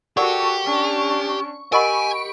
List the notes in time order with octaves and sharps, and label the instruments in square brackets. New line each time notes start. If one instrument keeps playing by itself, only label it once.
[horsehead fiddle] F#4 A4 [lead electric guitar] G4 [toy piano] A#4 D5 F#5 [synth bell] C#6
[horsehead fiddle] C#4 D4
[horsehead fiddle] G4 [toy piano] A#4 D#5 F#5 [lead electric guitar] G#5 [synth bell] B5 C#6 D7